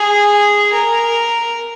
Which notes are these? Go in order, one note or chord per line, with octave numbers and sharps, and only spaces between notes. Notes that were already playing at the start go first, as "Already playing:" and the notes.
Already playing: G#4
A#4